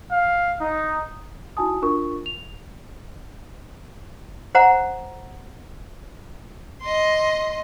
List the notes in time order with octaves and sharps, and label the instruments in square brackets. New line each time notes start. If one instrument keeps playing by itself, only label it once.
[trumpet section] F5
D#4
[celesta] D#4 E4 F#4 G#5 A5 D#6
D4 F4 A#4 C#6
F7
[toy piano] C5 F#5 A#5
[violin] D#5 C6